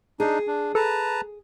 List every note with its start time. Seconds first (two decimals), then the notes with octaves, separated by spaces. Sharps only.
0.20 D4 D#4 G#4
0.47 D4
0.75 A4 B4 A5 A#5